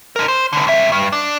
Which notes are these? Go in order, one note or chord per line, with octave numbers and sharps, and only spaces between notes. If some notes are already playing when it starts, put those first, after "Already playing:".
D3 A#4
C5
C#2 D3
C#2 E5
G2
D4